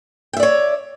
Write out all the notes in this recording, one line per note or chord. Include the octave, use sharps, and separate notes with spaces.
C#5 D5 E5 G5